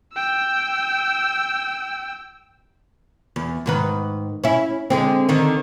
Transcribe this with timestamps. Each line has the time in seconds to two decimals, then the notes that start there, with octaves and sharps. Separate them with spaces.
0.14 G5 E6
3.36 E2
3.66 G#2 D#3 B4
4.44 C#4 E4
4.90 D3 G#3 C4
5.29 D3 D#3 D#4